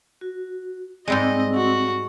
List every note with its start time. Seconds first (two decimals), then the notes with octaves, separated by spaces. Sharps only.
0.21 F#4
1.08 G#2 G3 G#3 C4 D#5 E6
1.55 F#4